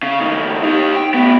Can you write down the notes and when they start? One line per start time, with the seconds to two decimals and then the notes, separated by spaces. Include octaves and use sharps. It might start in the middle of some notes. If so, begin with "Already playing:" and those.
0.03 C#3
0.21 C#2 D#3
0.63 D#4 G4
0.96 G5
1.14 A2 B3